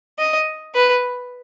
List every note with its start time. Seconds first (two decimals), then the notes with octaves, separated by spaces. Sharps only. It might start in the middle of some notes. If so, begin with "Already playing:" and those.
0.19 D#5
0.75 B4